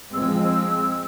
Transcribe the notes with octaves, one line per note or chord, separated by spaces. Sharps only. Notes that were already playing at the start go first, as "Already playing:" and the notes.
F3 G#3 C4 E6